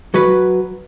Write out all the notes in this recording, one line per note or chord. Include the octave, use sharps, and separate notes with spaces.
F#3 B4